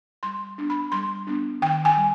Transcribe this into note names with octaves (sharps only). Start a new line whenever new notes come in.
G3 C6
B3 D4
B5
G3 C6
B3 D4
D#3 G5
G#5
G3